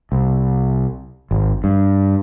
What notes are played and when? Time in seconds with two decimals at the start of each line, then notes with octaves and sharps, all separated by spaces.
0.12 C2
1.31 G#1
1.64 G2